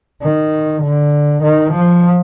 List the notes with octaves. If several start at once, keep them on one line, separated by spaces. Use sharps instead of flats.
D#3
D3
D#3
F3